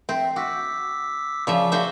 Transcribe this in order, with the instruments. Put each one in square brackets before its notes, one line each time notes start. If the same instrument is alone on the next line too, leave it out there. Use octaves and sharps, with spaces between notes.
[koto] C4 [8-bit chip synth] E5 G5
[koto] F#4 [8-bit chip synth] D6 E6 B6
[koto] C#3 F3 E5 [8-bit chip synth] D5 C#6 D6
[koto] F#4 C5 E5